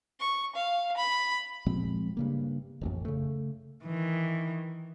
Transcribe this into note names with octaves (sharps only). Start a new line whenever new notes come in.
C#6
F5
B5
A#2 F3 G#3 C4
G2 C#3 A#3
D1 A1 F2
C#3 A3
D#3 E3